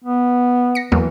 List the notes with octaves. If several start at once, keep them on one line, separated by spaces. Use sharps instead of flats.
B3
A#6 C#7
E2 E3 F#3 A#3